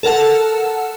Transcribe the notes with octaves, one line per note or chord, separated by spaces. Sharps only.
A4 A#4 F#5 A5